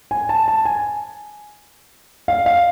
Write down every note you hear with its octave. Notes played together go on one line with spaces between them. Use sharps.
G#5
A5
A5
G#5
F5
F5